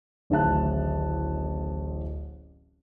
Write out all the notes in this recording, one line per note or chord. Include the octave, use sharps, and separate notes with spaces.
D1 A1 D#3 E5 A5 F#6